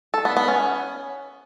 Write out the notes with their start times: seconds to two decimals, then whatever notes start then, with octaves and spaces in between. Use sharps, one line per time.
0.14 A4
0.25 B3
0.37 B3
0.48 C#4